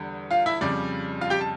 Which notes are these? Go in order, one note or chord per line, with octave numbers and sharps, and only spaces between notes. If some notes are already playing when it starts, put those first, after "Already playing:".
Already playing: E2 D3 G3
F4 F5
E4 E5
F2 C#3 G3 D5
F4 F5
G4 G5
A5